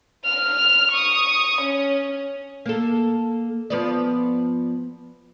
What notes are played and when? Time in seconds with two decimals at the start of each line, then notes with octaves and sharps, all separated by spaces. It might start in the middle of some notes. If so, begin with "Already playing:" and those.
0.25 F6 F7
0.92 C#6 D#6
1.61 C#4
2.66 A#3 A4
3.70 F3 B3 D5